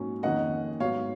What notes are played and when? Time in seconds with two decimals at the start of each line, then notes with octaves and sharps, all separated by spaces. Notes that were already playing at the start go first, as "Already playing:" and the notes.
Already playing: G#2 F#3 A#3 C#4
0.23 F2 D#3 A#3 C#4 D#5 F#5
0.80 G#2 F#3 B3 C#5 F5